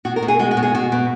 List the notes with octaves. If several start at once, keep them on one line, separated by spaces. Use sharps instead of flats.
B2 F#4
A#4
B2
G#4
G#3 F#4
F#4
B2
G#4
B2 F#4
B2